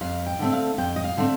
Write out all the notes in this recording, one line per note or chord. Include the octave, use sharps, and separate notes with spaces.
F2 F5
G5
D3 A3 C4
F5
F2 G5
D#5
F5
D3 A3 C4